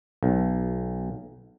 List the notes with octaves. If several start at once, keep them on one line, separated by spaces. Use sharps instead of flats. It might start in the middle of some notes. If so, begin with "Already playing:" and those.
B1